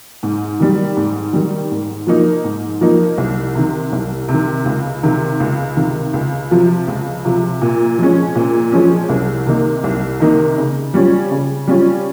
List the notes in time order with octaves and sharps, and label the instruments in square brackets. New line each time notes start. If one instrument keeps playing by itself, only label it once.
[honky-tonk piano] G#2
D#3 G3
G#2
D#3 G3
G#2
F3 A#3 D#4
G#2
F3 A#3 D#4
C2
C3 D#3
C2
C3
D#3
C#2
C3 D#3
C#2
C3 D#3
C#2
C3 F3
C#2
C3 F3
A#2
F3 G#3 C#4
A#2
F3 G#3 C#4
C2
C3 D#3 A#3 D#4
C2
C3 D#3 A#3 D#4
C#3
G3 C#4 F4
C#3
G3 C#4 F4